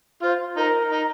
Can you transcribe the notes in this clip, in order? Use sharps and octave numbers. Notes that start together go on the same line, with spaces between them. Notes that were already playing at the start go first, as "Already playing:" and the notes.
F4 C5
D#4 A#4
D#4